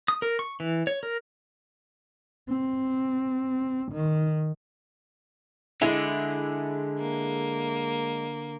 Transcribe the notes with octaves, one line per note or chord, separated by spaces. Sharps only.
D#6
A#4
C#6
E3
C#5
A#4
C4
D#3
D3 G#3 E4
A#3